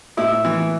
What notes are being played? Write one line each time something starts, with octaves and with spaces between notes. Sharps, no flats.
A2 E4
E3